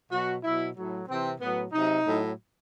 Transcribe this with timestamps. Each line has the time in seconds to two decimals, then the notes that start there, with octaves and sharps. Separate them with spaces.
0.11 B2 F#3 F#4
0.43 B2 F#3 E4
0.76 A2 F#3
1.08 C3 E3 C4
1.40 A2 F#3 B3
1.73 C3 F#3 D#4
2.05 A2 F#3